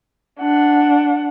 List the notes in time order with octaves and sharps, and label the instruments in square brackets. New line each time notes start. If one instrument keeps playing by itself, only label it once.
[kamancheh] D4 F#5